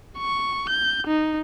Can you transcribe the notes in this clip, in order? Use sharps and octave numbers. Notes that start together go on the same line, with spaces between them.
C#6
G6
D#4